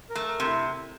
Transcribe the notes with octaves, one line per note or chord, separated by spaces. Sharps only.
A#4
A3
A#4
C3
E4